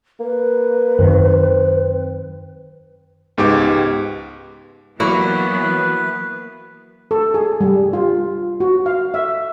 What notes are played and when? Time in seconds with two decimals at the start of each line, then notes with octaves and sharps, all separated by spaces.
0.20 A#3 B4
0.99 F#2 D#3 C4
3.37 C#2 G#2 B3 G4 D6
5.00 E3 F#3 A#3 B3 E4 F#4 B4
7.11 A4
7.34 G#4
7.61 G3
7.93 F4
8.60 F#4
8.86 F5
9.14 E5